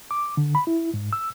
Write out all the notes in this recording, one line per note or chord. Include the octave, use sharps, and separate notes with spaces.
D6
D3
B5
E4
G#2
E6